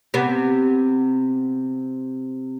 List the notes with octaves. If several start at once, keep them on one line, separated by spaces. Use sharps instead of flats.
C3 B3